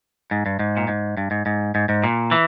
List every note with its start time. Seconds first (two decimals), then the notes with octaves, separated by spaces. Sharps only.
0.31 G#2
0.46 G2
0.59 G#2
0.77 A#2
0.88 G#2
1.17 G2
1.31 G#2
1.46 G#2
1.75 G#2
1.89 G#2
2.04 A#2
2.31 E3